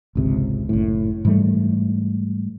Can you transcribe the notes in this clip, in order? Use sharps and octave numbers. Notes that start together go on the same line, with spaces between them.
G#1 C#2 C3
F#1 A2
G#2 E3 G3 A3